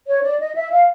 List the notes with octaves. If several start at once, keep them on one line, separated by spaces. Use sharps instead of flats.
C#5
D5
D#5
E5
F5